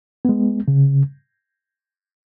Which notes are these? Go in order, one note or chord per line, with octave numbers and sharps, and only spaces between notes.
G#3 B3
C#3